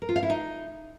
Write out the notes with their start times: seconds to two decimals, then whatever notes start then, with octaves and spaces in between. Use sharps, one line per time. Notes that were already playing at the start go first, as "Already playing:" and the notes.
0.02 A#4
0.09 F4
0.16 F5
0.23 E4
0.30 D#4